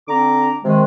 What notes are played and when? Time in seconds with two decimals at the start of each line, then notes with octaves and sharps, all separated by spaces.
0.08 D3 C4 A#5 D6
0.64 C3 D#3 G#3